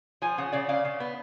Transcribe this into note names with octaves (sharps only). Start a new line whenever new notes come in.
F3 G#5
C#3 F#5
C#3 D5
C#3 F5
C#3
B3